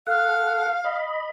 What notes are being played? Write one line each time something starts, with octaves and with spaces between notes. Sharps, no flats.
A4 F5 F#5
D#5 B5